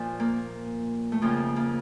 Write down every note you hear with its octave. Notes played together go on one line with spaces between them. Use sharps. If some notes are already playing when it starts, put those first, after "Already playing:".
Already playing: A#2 F3
A#3
A3
F2 C#3 F3 A#3
A#3